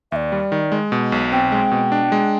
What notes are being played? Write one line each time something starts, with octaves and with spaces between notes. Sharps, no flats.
D#2 D5 E5
G3
D#3
G#3
B2
B1
C4 G5
G#3
B2
D4
G#3